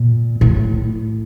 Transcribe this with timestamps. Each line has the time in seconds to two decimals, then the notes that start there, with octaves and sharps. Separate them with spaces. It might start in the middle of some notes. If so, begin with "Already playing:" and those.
Already playing: A#2
0.41 A2